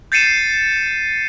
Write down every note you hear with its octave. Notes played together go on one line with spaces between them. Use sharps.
G6 A6 C7 C#7 D#7 E7